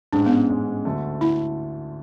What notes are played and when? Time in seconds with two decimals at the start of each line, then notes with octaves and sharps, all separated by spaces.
0.13 A1 G#2 G#3 D4
0.26 B3
0.30 C#4
0.50 A1 G#2 G#3
0.85 D2 D3 A3
1.21 A3 E4